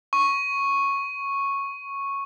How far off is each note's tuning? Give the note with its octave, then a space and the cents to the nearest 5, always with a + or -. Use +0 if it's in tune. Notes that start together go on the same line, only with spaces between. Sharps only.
C#6 -5